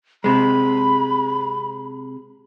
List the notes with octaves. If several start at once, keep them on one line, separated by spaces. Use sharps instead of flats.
C3 G#3 B5